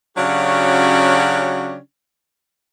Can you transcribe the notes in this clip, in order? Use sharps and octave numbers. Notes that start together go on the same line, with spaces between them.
C#3 F#3 C#4 D4 F#4 G4